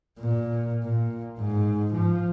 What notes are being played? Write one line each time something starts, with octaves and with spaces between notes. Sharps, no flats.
A#2
A#2
G#2
F3